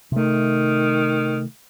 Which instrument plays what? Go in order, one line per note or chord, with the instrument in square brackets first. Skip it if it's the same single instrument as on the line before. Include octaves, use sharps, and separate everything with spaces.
[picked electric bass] C3 A3 [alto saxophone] D#3